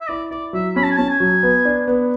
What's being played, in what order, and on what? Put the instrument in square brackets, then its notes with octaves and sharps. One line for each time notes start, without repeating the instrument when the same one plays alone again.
[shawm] E5
[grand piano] E4 [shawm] D5
[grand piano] E4 [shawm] D5
[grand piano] F#3 [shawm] E5
[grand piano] C#4 [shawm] B5
[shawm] A5
G#5
[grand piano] C#4 [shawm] A5
[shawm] G#5
[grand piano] F#3
B3
D4
B3